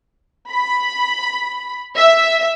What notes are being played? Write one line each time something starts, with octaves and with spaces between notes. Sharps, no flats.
B5
E5